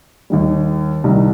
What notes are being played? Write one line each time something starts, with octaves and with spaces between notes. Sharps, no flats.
D#2 D#3 G3
C2 C3 D#3 G3